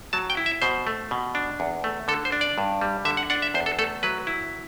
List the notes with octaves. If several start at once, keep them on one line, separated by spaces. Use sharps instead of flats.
F#3 A5
G5
E4
E5
B2 C5
A3
B2
D4
E2
A3
D3 A4
C5
D4
D5
G2
G3
D3 E5
F#5
D4 F#5
E5
E2 C5
A4
A3 A4
F#3 B4
E4